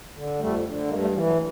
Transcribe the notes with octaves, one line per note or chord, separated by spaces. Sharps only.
D3
F2 G3 A3
D3
G2 G#3 A#3
G3 A3
E3 F3 G3
F#3